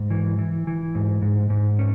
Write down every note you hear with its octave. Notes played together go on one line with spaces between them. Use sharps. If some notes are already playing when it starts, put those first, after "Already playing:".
Already playing: G#2
E3
E3
E3
G#2
G#2
G#2
C#4